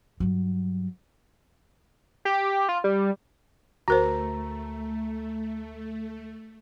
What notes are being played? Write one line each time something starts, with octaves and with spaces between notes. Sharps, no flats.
G2 F#3
G4
F4
G3
D2 A3 F#4 A#4 C5 A#5